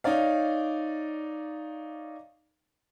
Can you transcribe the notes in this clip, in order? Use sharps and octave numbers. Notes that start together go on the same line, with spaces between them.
D#4 C#5 D5 F5